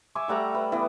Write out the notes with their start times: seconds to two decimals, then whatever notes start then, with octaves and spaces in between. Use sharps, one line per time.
0.15 E5 G#5 C#6 D6
0.28 G3 A3 F#5 A#5
0.55 B4
0.72 E3 B3